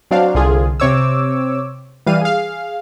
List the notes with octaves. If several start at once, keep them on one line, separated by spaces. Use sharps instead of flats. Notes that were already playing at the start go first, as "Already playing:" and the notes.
F#3 C4 D4 D5 F5
C2 D3 F4 G#4
C3 C4 C#5 D6 E6
E3 G3 F5 D#7
G#4 F5